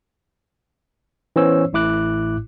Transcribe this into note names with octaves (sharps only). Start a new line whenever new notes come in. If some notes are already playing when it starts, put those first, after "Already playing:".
E3 B3 C#4 C5 C#5 E6
A1 A2 E4 D6 F#6